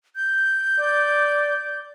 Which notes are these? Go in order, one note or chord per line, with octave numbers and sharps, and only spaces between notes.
G6
D5